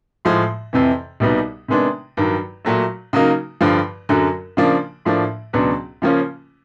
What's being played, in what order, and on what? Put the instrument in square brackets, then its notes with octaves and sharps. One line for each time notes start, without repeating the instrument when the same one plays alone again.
[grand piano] A2 F3 G#3
F2 C3 E3
C2 B2 G3 B3 D#4
C3 D#3 G#3 B3 D4
G2 D#3 F#3
A#2 F#3 A3
C#3 F#3 A#3 D#4
G2 D3 F3
F#2 D3 F#3
C#3 F3 A#3 D4
A2 F3 A#3 D4
C#2 B2 F#3 B3 D4
C#3 F3 A#3 C#4 F4